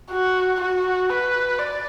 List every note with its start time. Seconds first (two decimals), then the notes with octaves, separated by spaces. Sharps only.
0.11 F#4
0.61 F#4
1.10 B4
1.59 D5